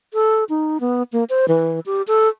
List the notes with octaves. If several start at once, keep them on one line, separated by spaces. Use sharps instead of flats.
A4
D#4
B3
A#3
C5
E3
G4
A4